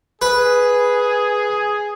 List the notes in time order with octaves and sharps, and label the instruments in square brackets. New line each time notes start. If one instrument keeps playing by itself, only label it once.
[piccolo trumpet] G#4 [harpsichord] B4